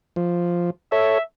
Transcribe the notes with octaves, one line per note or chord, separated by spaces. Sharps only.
F3
A4 C#5 E5